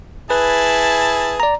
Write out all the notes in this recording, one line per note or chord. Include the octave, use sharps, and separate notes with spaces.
E4 G#4 B4 A5
D5 A#5